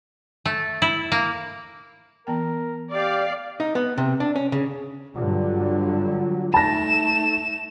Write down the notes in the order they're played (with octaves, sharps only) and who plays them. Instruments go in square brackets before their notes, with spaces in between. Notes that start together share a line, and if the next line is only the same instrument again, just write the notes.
[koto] A3
E4
A#3
[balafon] E3 B3 G5 [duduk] A#4
[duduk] G4 [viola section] D5 F5
[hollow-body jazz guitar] D#4
B3
C3
D4
C#4
C#3
[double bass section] G2 D3 F#3 [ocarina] F4
[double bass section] A3 [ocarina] D#4 [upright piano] A5 A#6 [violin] E7